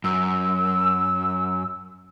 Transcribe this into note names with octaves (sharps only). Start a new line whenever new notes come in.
F#2 E6